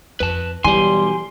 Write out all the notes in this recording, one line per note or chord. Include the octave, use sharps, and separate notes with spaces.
F2 B4 A5
B1 E3 G3 G4 G#5 C6